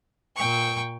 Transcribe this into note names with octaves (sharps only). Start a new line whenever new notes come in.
A#2 G5 C#6